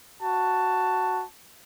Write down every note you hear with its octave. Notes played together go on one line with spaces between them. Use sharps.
F#4 A5